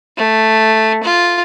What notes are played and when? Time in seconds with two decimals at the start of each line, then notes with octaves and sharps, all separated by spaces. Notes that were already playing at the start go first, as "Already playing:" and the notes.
0.17 A3
1.03 F4